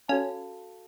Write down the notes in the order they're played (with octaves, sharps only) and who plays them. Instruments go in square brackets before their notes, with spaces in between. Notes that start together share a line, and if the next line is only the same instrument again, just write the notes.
[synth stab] C#4 [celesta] F#4 A4 F5 A5